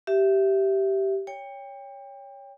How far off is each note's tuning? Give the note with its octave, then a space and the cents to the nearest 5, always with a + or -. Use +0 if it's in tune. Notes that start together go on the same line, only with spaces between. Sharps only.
G4 -15 E5 +5
C#5 +10 G5 +25